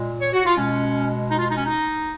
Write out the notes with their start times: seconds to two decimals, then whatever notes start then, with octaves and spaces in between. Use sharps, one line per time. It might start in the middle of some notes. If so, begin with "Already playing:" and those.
Already playing: A#2 G#3
0.21 C#5
0.33 F#4
0.45 F4
0.57 B2 G#3 C#4
1.30 D#4
1.39 F4
1.50 D#4
1.57 C#4
1.66 D#4